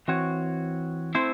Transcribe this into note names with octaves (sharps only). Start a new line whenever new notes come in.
E3 C4 F#4 C#5
A3 C4 E4 C5